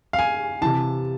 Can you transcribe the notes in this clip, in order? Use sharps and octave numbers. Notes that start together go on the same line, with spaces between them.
F5
G#5
C3 E3 A5